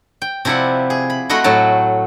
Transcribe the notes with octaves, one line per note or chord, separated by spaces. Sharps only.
G5
C3 F3 E4 D5 F#5
G#4
B5
A3 F#4 D#5 F#5 B5 C6
A2 F#3 A5